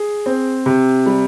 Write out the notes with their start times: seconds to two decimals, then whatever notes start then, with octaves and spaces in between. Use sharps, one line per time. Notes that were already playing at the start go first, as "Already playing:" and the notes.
Already playing: G#4
0.26 C4
0.66 C3
1.06 G3